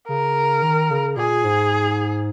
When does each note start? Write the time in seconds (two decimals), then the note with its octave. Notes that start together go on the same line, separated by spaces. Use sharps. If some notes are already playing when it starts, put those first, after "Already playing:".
0.08 C#3 A#4
0.62 D#3
0.90 C#3
1.17 A#2 G#4
1.44 G#2